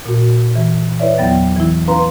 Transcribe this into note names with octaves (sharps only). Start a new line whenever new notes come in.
A#2 F#4
E3
E4 B4 C#5 D5 E5
E2 F#3 B3 G5 A6
E3 E4
C#4 E4 B4 F5 A#5 C6